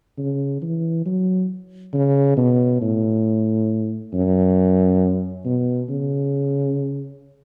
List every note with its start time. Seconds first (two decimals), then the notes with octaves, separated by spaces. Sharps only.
0.18 C#3
0.62 E3
1.06 F#3
1.94 C#3
2.37 B2
2.81 A2
4.14 F#2
5.45 B2
5.89 C#3